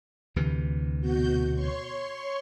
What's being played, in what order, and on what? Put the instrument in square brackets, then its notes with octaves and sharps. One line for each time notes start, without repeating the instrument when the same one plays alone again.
[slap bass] D2 C3 E3
[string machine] B2 F#4 G6
C#5 C6 C#6